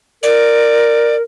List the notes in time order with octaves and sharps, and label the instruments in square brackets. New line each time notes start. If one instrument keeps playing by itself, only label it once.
[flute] A#4 [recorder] D5